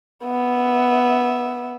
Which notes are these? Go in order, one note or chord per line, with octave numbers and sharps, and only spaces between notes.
B3 E5